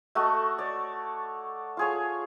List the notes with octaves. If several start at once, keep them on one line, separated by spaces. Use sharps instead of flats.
A3 F#4 A4 D#5
C#5 D5
F4 G#4 C#5